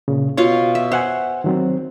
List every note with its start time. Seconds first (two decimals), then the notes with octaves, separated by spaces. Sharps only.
0.08 A#2 C#3
0.37 B2 F4 C#5 F5 C#6
0.75 E5
0.92 C5 E5 F#5 G#5
1.44 D#3 F#3 C4